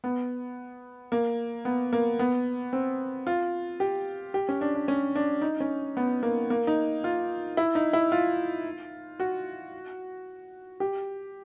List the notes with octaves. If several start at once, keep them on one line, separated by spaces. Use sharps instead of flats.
B3
A#3
B3
A#3
B3
C4
F4
G4
G4
C#4
D4
D4
C#4
D4
D#4
C#4
B3
A#3
A#3
D#4
F4
E4
D#4
E4
F4
F#4
G4